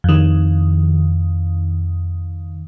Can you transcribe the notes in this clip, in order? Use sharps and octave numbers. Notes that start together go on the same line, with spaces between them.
F2 D#3